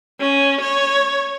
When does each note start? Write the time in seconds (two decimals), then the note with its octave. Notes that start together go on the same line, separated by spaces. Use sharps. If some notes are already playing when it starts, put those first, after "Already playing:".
0.21 C#4
0.61 C#5